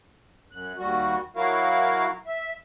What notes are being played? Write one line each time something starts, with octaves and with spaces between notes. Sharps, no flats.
F#2 F#6
D#2 G3 F#4
F#3 E4 F#4 A#4 F5
E5